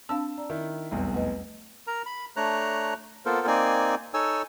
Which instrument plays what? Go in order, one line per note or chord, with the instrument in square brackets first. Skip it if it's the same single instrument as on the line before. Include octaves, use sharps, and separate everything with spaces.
[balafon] C4 D4 F5 [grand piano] A5 E6
[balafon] D5 A#5
[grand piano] D#3 E4
[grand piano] F1 B1 E2 [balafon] G3
[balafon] A3 B4 D#5
[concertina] A#4 A#5
B5
A3 D4 C#5 A#5 F#6
A#3 B3 F4 A4 A#4 C5
A#3 C4 D#4 D5 G#5
D#4 A4 C#5 G#5 E6